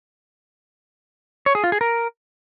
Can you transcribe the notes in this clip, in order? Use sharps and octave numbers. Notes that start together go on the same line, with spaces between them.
C#5
G#4
F4
G#4
A#4